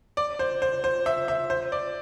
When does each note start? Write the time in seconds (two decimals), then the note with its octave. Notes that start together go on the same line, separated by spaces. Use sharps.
0.17 D5
0.39 C5
0.62 C5
0.84 C5
1.06 E5
1.28 E5
1.50 C5
1.72 D5